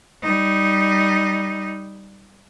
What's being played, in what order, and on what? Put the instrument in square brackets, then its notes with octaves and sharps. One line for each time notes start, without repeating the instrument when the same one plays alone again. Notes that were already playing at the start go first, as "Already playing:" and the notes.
[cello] G3 D#4